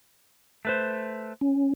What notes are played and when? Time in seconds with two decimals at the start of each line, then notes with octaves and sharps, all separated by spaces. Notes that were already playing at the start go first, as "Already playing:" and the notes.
0.65 A3 B4 C5
1.41 C#4